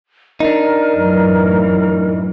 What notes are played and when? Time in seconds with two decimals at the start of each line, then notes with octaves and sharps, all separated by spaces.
0.40 D4 D#4 A#4
0.96 F#2 A2 E3